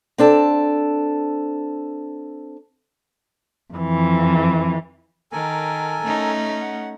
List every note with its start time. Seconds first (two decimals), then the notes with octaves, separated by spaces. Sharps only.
0.18 C4 D4 A4 A5
3.73 F2 E3
5.32 D#3 A4 A#4 G#5
6.02 A3 C#4 D#4
6.61 F#5